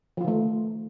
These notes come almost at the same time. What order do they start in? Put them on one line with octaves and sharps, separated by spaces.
F3 F4 D#3 A3